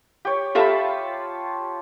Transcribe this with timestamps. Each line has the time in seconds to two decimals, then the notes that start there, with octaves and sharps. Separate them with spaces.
0.25 G4 C#5
0.55 F4 G4 A4 E5 A5 B5